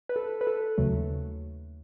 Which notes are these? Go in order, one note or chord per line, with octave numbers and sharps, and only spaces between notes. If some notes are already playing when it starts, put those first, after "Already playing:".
B4
A4
B4
A4
D#2 C#3 F#3 A3